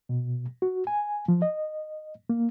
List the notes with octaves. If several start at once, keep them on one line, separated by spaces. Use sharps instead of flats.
B2
F#4
G#5
F3
D#5
A#3